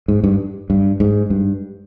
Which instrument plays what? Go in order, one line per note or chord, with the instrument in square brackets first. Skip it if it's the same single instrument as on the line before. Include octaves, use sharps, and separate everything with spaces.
[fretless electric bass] G#2
G2
G2
G#2
G2